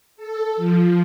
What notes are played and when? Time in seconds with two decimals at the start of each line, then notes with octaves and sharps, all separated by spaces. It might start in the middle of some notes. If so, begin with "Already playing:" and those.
0.16 A4
0.56 F3